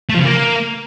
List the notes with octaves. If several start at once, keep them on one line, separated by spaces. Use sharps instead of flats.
A3
F3
C#3
A#3